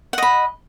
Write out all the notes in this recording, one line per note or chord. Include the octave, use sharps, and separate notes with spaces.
D#5 F#5 B5